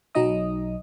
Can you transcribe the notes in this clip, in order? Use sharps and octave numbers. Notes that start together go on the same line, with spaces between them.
B1 F#3 D#4 D#5 D#6